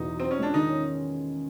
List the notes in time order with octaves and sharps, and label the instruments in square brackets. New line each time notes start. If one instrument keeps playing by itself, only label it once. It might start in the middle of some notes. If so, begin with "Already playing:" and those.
Already playing: [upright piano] E2 B2 [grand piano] D#4
[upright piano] F#3
[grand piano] C4 [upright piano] F4
[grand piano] C#4
[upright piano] G#3 [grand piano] D4
[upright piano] D#3 [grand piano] D#4
[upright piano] C#4